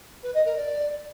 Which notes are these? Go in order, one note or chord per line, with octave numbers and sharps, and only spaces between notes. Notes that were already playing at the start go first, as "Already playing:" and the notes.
B4
D#5
A#4
D5